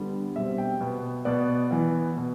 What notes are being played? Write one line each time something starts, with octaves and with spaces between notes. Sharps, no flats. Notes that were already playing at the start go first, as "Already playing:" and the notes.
Already playing: D3 G3 B3
B2 G3 C4 E5
G5
B2 B3
B2 B3 D5
E3 B3
B2 B3